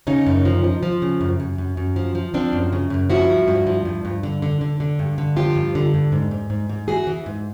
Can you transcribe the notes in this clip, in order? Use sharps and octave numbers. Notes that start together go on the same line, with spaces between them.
C#3 C#4 D#4
F#2
F3
F3
F3
C#3
F#2
F#2
F#2
F#2
F3
F3
F3 C4 D4
F#2
C#3
F#2
F3 E4 F#4
G2
G2
F3
G2
G2
D3
D3
D3
D3
G2
D3
F3 F4 G4
G2
D3
G2
G#2
G#2
G#2
G#2
E3 F#4 G#4
E3
G#2